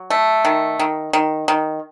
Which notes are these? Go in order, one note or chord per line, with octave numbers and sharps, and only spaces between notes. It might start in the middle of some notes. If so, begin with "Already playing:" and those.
Already playing: F#3
A3
D#3
D#3
D#3
D#3